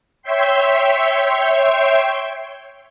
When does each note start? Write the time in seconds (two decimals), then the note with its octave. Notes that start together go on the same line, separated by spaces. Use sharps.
0.22 C#5 E5 G5 C6